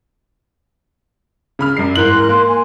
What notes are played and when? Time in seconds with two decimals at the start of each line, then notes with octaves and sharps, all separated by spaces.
1.59 C#3 B5 F6
1.77 F#2 G3 C7
1.96 G#2 E3 A#4 C6 F#6 F#7
2.29 A#3 C6
2.47 G#5